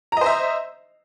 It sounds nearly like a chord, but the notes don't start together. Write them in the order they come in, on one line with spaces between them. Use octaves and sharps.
A#5 D#5 C5 E5